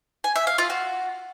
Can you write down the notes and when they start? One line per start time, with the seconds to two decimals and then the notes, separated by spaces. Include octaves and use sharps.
0.24 G#5
0.36 E5
0.47 F5
0.58 F4
0.70 F#4